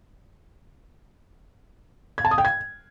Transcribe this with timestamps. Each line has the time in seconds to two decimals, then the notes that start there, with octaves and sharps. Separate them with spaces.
2.18 G#6
2.25 A5
2.31 D#6
2.38 G5
2.45 G#6